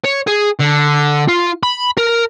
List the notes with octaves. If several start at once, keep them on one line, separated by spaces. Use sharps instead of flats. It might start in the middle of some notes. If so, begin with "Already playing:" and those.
C#5
G#4
D3
F4
B5
A#4